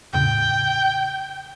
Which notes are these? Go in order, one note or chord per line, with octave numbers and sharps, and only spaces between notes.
E2 A2 C#3 G5